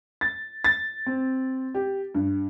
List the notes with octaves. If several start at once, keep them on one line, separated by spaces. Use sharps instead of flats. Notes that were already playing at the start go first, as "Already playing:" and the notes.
A6
A6
C4
G4
G2